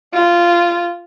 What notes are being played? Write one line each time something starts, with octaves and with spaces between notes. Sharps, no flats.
F4